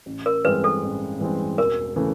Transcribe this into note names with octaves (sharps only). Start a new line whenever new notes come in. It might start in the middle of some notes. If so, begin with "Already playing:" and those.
A1
A#4
G2 E3 G#3 C4 B4
A4
A1
G2 E3 G#3 C4
E1 A#4
C#3 E3 A3